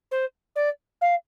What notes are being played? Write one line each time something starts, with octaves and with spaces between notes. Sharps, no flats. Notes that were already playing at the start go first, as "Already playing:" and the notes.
C5
D5
F5